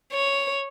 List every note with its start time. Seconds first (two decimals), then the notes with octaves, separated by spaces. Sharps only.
0.13 C#5